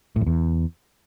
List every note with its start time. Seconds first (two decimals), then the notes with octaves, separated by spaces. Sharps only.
0.16 A2
0.21 F2
0.27 E2